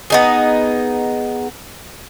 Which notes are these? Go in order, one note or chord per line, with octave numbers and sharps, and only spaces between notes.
B3 D#4 G#4